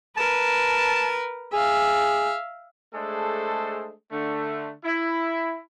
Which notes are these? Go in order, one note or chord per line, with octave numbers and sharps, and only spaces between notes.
A#4 B4 A5
G#4 E5 F5
G#3 A3 D4 G#4 A4 C5
D3 A3
E4